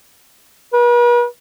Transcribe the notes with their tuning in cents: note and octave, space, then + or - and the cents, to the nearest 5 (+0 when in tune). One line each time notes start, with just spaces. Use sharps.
B4 -45